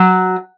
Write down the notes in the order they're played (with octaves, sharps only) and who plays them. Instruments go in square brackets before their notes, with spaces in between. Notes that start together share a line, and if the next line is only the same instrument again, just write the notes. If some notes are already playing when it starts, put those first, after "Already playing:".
Already playing: [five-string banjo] F#3